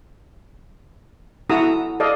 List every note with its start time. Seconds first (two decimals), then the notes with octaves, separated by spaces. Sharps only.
1.50 E4 F#4 A4 A#5 D#6 E6
2.00 A4 D5 D#5 F5